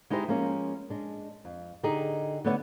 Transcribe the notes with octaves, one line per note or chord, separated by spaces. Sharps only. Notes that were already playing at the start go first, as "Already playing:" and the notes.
G#3 D#4 E4 G4 C5
F3 G#3 A#3 C#4
G#3 D4
F2
D3 D#4 G4 G#4
D3 A3 B3 C#5 D5 F#5